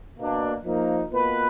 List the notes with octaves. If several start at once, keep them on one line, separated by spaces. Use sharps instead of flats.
B2 A#3 D4
F3 A#3 D#4
B2 A#3 F4 B4